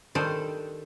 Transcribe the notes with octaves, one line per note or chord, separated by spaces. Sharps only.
D#3 G3 D4 A4 C5